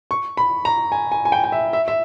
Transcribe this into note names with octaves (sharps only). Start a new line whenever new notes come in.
C#6
B5
A#5
G#5
G#5
G#5
G5
G5
E5
E5
E5